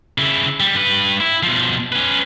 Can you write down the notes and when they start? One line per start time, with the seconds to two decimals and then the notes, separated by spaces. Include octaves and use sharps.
0.18 C#3 E4
0.60 G3
0.75 G2 B4
1.20 E4
1.43 B2 F3
1.92 C#4 B4